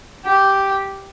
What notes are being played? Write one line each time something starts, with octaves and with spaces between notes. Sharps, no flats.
G4